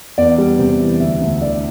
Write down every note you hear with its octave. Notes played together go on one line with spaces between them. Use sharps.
E2 D5
G3
C3
E3
D2 E5
D2
D3 D5